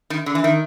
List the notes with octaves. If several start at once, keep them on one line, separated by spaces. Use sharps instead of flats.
D#3
D3
E3
D#3